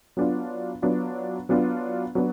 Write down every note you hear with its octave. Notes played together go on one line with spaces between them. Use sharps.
F#3 B3 D4 F4
F#3 B3 D4 F4
F#3 B3 D4 F4
F#3 B3 D4